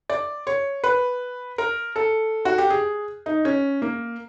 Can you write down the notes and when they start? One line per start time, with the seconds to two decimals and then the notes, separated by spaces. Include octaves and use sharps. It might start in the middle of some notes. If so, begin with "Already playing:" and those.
0.10 D5
0.47 C#5
0.84 B4
1.58 A#4
1.96 A4
2.45 F#4
2.58 G4
2.70 G#4
3.26 D#4
3.45 C#4
3.82 A#3